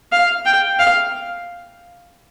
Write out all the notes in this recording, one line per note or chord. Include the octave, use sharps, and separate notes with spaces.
F5
G5
F5